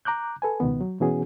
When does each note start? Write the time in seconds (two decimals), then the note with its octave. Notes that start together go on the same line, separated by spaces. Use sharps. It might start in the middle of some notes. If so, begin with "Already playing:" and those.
0.05 A#5 D6 F#6 G6
0.42 A4 B4 G#5
0.60 C#2 B2 D#3 B3
0.81 F#3
1.01 B2 E3 B3 C#4 F#4 G#4